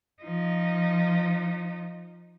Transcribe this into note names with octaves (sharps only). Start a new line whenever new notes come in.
F3 D#4